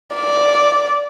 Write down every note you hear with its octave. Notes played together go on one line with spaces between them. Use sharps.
D5